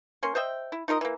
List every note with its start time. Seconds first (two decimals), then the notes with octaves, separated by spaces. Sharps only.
0.23 A#3 C#4 C6
0.35 C5 D#5 E5 G5
0.72 E4
0.88 D#4 F4 A#4 D#5
1.01 E3 A#3